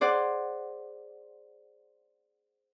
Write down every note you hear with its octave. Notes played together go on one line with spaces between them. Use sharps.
G#4 C5 D5 F#5